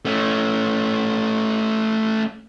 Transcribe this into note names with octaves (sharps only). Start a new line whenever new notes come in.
A3 C#4